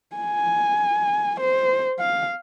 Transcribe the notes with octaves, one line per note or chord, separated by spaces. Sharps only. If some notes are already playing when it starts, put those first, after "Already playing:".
G#5
C5
F5